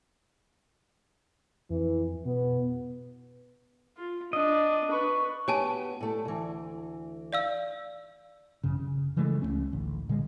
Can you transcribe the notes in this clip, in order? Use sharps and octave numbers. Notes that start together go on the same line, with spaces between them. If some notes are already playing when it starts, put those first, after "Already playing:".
F2 E3
B2 B3
F4
D4 D#5
B4 C#6
B3 F#4 G4 C#5 G#5 A5
A2 A3
D2 E3
D5 F5 E6
A1 F#2 C#3
C#3
C#3 E3 G#3 A3
C#2 G#2 A3 C#4
A1 D2
A#2 D3 G3 G#3